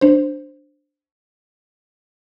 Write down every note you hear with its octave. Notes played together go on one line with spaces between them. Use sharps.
D4 C5